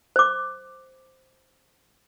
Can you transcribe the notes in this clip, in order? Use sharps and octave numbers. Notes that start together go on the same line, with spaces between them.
C5 D6